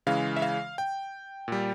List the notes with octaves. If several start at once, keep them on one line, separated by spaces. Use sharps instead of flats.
C#3 E3 G#3 F5
E5
F5
G5
A#2 G3